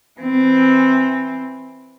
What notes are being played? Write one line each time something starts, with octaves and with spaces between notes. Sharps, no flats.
E3 C4